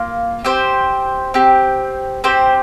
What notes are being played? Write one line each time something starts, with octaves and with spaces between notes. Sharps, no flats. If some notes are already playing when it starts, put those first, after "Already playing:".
Already playing: A#3 F4
C4 G4 C5
C4 G4
C4 G4 C5